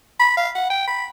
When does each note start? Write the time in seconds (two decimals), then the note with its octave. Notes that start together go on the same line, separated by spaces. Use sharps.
0.20 B5
0.37 F5
0.55 F#5
0.70 G5
0.87 B5